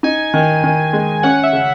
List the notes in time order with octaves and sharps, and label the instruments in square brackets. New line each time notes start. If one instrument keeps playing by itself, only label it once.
[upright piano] D#4 [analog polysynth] G#5
[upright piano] D#3
D#3
G#3
[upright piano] C#4 [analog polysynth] F#5
[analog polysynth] E5
[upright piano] C#3